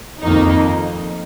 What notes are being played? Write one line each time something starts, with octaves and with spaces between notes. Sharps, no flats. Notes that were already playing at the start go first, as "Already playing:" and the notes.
F2 D#3 A#3 D#4